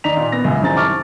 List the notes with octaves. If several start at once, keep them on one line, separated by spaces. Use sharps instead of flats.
D#3 D5 D#5 A#5 B6 F7
A#2
B3 A#6
C#2 F#2
C2 F#2 D#3 C5 A#5 A6
A5 C#6 D6 F6